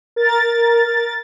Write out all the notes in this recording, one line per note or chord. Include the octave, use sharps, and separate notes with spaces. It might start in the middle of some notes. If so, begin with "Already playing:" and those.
A#4 A6